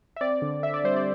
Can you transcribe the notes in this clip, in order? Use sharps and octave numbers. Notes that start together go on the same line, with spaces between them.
E5
C4 D5
D3
D3 E5
D5
G3 C5
D5